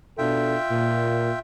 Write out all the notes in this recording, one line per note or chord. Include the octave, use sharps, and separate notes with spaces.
B2 D4 F4 A4 E5 G5
A#2